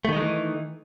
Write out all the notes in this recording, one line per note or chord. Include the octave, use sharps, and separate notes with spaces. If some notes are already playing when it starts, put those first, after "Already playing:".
D#3 E3 G#3 A3 D#4